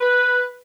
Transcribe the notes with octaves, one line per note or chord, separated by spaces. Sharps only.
B4